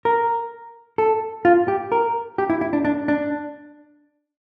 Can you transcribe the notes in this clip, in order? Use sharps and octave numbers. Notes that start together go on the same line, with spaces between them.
A#4
A4
F4
G4
A#4
G4
E4
E4
D4
D4
D4